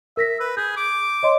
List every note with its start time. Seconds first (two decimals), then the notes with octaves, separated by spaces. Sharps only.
0.17 A#4 E5 A#6 B6
0.40 B4
0.57 G#4 G6
0.77 D6
1.23 C#5 D#5 C6